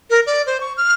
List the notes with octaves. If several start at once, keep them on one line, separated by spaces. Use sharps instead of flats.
A#4
D5
C5
C#6
F6